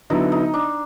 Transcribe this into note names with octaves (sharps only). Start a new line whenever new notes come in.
D3 F#3 B3 D#4 E4
D#4
D4